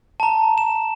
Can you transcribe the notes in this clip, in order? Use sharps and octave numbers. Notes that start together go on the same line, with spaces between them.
A5 A#5
E7